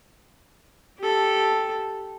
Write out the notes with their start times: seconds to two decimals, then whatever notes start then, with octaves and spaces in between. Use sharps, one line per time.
0.99 G4 A4